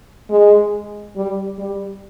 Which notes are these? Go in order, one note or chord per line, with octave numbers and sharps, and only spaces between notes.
G#3
G3
G3